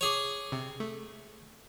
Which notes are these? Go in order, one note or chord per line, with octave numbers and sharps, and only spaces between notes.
G#4 C#5 D6 F7
C3
A3